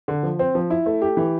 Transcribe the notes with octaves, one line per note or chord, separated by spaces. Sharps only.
D3
F3
C4
F3
E4
A3
G4
E3